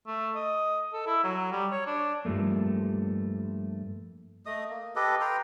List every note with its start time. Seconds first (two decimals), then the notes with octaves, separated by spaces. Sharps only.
0.07 A3
0.35 D#5
0.93 A4
1.07 E4
1.24 F#3
1.52 G3
1.71 C#5
1.87 D4
2.25 G2 F3 G3 A3 A#3
4.46 A3 D#5 D#6
4.70 A#3
4.96 G4 A4 B4 D#5
5.21 B4 G5 A#5 C6